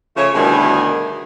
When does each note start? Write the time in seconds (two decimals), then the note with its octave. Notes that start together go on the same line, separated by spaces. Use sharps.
0.17 C#3 F3 A3 C#5
0.35 D2 B2 D#3 E3 G3 G#4